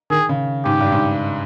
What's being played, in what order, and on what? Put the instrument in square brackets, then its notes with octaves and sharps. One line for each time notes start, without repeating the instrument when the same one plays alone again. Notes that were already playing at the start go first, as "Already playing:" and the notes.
[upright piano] D#3 [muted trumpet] G#4
[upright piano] C#3
[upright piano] G#2 [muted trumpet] G4
[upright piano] G2
G#2